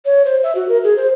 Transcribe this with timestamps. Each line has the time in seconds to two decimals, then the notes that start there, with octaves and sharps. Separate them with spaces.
0.05 C#5
0.25 C5
0.43 E5
0.55 F#4
0.69 A#4
0.84 G#4
0.96 C5